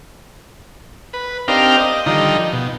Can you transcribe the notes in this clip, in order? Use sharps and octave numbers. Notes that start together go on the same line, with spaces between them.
B4
C4 D4 D#4 G4 A#4 F5
D#5
D3 D#3 F3 G3 D#4
B2